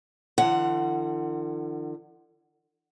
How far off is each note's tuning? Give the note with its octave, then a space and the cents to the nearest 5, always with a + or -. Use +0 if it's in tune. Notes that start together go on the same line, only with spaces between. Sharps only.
D3 +40 F3 -45 F#5 +10